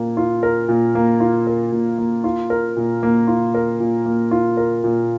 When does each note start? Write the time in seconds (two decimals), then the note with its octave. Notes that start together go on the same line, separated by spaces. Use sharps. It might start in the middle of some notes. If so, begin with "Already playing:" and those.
Already playing: A#2 A#3
0.17 F4
0.43 A#4
0.68 A#2
0.95 A#3
1.20 F4
1.47 A#4
1.72 A#2
1.98 A#3
2.24 F4
2.50 A#4
2.77 A#2
3.03 A#3
3.27 F4
3.54 A#4
3.80 A#2
4.06 A#3
4.31 F4
4.57 A#4
4.84 A#2